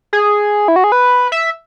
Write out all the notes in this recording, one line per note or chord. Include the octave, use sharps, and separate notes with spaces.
G#4
E4
F#4
G#4
B4
E5